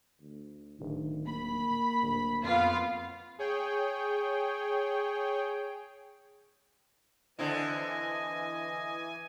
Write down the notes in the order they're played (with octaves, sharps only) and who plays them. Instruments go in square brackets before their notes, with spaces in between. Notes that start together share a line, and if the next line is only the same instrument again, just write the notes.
[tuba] D2
[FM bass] D1 [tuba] D#3
[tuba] A#3 [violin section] B5
[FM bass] D1
[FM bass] F2 [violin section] B3 F4 F5
[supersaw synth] G#4 C#5 G5
[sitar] D3 C4 E4 [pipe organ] E3 G#5 [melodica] D#5